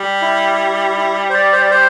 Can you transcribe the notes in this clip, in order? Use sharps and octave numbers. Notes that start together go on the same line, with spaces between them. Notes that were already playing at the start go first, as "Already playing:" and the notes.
Already playing: G3
E4
E4
C5
D5
C5
D5
C5